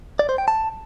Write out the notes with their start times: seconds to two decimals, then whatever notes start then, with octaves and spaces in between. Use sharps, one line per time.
0.19 D5
0.29 C5
0.38 G5
0.48 A5